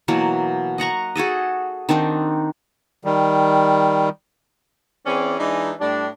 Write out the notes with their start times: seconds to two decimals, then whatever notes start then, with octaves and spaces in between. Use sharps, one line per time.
0.08 B2 E3 F#3 A#3
0.78 D#5 F#5 A#5 C#6
1.16 F#4 G#4 A4 D#5
1.89 D#3 C4 D4 D#4
3.04 D#3 G3
5.06 E3 C4 C#4 G#4 D5
5.39 E3 G#3 D4 D#4
5.80 A2 G3 D4